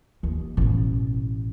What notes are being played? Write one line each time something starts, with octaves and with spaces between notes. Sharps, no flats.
D#2
A1 B2